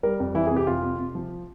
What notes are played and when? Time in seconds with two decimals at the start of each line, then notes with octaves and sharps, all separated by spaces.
0.03 G3 A#4
0.20 F2
0.35 E3 E4
0.47 C3 G#4
0.57 G4
0.67 F2 F4
0.83 C3
0.99 C3
1.15 F3